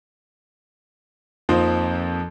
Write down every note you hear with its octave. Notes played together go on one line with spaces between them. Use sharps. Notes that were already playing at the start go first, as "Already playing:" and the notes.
F2 F3 A#3 C4 D#4